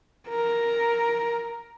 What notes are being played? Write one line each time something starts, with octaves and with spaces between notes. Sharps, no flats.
A#4